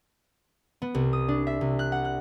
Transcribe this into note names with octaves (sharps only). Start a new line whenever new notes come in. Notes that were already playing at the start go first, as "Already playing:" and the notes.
B3
C2
D#6
D4
E5
C2
F#6
F#5
F#6